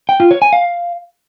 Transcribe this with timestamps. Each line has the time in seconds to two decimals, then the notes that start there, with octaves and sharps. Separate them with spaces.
0.09 G5
0.20 F4
0.31 C#5
0.42 G#5
0.53 F5